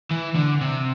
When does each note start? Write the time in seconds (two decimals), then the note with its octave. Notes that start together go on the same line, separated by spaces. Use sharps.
0.11 E3
0.36 D3
0.61 C3